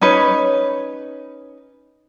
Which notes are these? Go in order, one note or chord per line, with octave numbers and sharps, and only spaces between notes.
C#4 D#4 B4 C#5